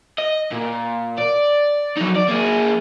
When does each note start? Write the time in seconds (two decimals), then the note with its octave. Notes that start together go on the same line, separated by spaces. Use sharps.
0.18 D#5
0.51 A#2
1.18 D5
1.97 F#3 D#4
2.16 D5
2.28 A#3 G#4